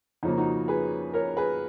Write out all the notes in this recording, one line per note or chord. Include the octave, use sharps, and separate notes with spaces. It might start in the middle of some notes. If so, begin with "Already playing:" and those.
F2 C#3 F3 A#3 D#4
D#4 F#4
G#4 B4
A#4 C#5
G#4 B4